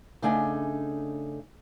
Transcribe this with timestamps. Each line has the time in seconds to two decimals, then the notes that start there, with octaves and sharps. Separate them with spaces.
0.22 C#3 A3 D4 D#4 G#5